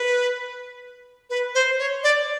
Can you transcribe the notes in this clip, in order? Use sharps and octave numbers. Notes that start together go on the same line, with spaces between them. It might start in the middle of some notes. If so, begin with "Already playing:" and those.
Already playing: B4
B4
C5
C#5
D5